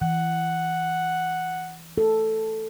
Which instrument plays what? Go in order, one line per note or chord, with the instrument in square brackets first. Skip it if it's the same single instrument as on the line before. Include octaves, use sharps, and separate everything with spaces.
[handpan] E3 [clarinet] F#5
[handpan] A4